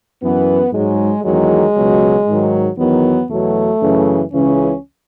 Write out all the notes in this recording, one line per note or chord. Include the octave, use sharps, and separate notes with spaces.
F#2 E3 B3
G#2 F#3 G#3
E2 D#3 F#3 G#3
C#2 B2 F#3
G#2 D#3 F#3
E2 D#3 F#3 B3
E2 B2 F#3 A3
F#2 C#3 E3
C#2 C#3 E3 C#4